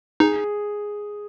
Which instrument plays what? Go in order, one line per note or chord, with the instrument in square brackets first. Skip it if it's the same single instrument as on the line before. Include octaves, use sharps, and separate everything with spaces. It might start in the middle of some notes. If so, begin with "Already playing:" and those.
[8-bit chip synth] D#4 [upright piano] G#4